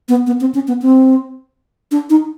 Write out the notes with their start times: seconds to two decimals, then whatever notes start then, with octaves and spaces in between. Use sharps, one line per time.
0.09 B3
0.27 B3
0.41 C4
0.54 C#4
0.68 B3
0.82 C4
1.91 D4
2.10 D#4